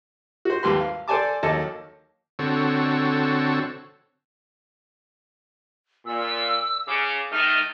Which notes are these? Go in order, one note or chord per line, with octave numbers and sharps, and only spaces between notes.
F#4 C5
G#1 D#2 G4 B4 C6
F5
A4 C5 D5 G#5 A5 D6
D#2 F#3 A4 C#5 D#5 A5
D3 C4 F#4 A4 C#5
A#2 E6
C#3 D6
D#3 A3 D#4 F6